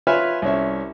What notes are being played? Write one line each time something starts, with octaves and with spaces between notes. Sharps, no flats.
F4 B4 C#5 E5 G#5 F6
C2 C#4 E5